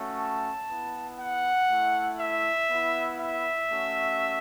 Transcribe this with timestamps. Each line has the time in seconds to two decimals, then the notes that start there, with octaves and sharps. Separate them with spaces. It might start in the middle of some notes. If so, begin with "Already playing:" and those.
Already playing: A3 C#4 F#4
0.20 A5
0.69 B3 E4
1.20 F#5
1.70 A3 E4
2.20 E5
2.70 B3 E4
3.20 E5
3.70 A3 C#4 F#4